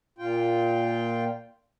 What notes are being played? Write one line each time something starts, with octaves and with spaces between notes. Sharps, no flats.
A#2 F4 G5